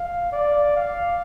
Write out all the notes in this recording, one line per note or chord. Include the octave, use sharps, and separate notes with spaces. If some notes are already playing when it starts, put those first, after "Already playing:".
Already playing: F5
D5
F5